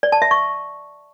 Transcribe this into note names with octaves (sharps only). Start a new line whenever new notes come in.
D5
A5
E5
C#6